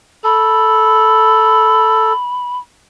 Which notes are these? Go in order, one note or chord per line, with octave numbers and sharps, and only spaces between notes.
A4 B5